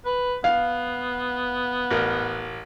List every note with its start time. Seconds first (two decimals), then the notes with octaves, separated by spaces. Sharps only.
0.06 B4
0.44 B3 F5
1.91 A1 A#4